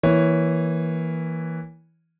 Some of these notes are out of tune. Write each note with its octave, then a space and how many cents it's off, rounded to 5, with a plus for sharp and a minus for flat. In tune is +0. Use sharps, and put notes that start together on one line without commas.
E3 -5 A#3 +10 C#5 +0